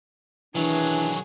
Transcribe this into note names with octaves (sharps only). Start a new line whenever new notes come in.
D#3 E3 F#3 D4 G#4